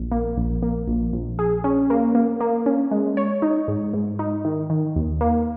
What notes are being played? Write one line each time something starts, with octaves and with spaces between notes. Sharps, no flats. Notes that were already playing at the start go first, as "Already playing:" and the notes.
Already playing: A#1
A#3
A#1
A#3
A#1
A#1
G#4
C#4
A#3
A#3
A#3
C#4
G#3
C#5
D#4
G#2
G#2
D#4
D#3
D#3
D#2
A#3